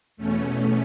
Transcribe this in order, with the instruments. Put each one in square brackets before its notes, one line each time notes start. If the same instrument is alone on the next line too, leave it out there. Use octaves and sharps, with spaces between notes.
[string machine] E2 B2 A3 C#4